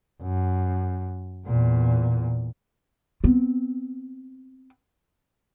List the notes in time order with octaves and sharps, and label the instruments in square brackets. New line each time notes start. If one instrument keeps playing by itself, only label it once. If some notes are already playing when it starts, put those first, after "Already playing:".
[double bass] F#2
E2 A#2
[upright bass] B3 C4